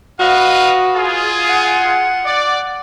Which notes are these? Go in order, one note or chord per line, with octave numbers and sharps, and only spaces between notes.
F#4 B4 D#5 F5
F4 G#4
F#5
D5